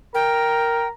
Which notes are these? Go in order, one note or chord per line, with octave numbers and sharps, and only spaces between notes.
A#4 G5 A#5